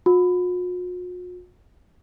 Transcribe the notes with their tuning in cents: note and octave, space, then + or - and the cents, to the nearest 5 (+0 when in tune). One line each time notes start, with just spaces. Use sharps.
F#4 -45